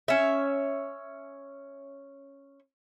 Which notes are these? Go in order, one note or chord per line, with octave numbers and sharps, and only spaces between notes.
C#4 E5